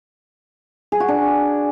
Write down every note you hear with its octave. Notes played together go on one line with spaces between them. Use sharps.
G#4
F#4
D4